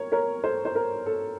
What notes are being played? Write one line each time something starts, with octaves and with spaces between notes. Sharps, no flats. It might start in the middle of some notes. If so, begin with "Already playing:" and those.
Already playing: A#4 C#5
A#4 C#5
A4 C5
C5
A#4
A4